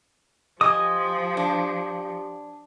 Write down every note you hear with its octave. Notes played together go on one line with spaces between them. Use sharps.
F3 G4 D#5 G#5 D#6
D4